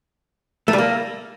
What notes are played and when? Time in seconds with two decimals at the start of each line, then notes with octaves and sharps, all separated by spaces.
0.68 A3
0.73 G3
0.78 A#3